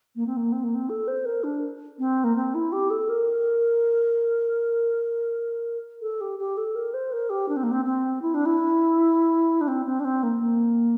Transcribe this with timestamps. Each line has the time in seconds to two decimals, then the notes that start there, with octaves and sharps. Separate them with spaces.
0.15 A#3
0.26 C4
0.36 A#3
0.52 C4
0.63 A#3
0.74 C4
0.89 A4
1.07 C5
1.25 A#4
1.43 D4
1.98 C4
2.23 A#3
2.35 C4
2.54 E4
2.72 G4
2.90 A4
3.09 A#4
6.01 A4
6.20 G4
6.38 G4
6.57 A4
6.75 A#4
6.93 C5
7.12 A#4
7.29 G4
7.48 D4
7.56 C4
7.63 A#3
7.71 C4
7.84 C4
8.21 E4
8.34 D4
8.45 E4
9.60 D4
9.67 C4
9.85 C4
9.99 D4
10.04 C4
10.23 A#3
10.40 A#3